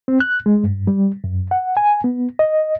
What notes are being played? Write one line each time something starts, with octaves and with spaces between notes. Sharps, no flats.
C4
F#6
G#3
G2
G3
F#2
F#5
G#5
B3
D#5